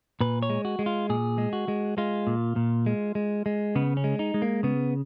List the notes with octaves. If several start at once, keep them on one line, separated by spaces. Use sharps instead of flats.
A#2 B4
C#5
G#3
F#4
G#3
F4
A#2 G#4
G#3
F#4
G#3
G#3 F4
A#2
A#2
G#3
G#3
G#3
C#3 B3
C#4
G#3
D#4
G#3
A#3
C#3 B3